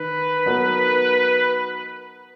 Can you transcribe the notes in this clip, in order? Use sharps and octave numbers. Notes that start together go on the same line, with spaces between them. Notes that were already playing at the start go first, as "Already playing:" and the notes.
Already playing: D#3 B4
F#3 B3 D#4 F#4 A#4